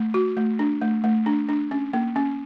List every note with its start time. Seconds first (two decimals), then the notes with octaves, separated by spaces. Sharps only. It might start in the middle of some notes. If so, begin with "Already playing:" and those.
Already playing: A3
0.14 F#4
0.37 A3
0.59 D4
0.81 A3
1.04 A3
1.26 D4
1.49 D4
1.71 C#4
1.93 A#3
2.16 C#4